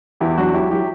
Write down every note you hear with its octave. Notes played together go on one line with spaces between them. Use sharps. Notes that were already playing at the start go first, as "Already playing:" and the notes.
E2 E4 G4
F#3 D4 F#4
F#3 E4 G4
F#3 E4 G4